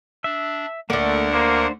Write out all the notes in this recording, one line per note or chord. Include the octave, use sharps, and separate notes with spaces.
D4 E5
D2 D3 A3 A#3 D4 A#4 F#5
A#3 C5